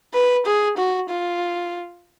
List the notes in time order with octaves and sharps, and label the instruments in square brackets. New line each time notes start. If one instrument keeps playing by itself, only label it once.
[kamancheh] B4
G#4
F#4
F4